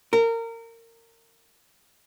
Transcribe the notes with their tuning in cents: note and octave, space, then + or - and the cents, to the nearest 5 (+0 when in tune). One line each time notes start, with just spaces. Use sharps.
A#4 -25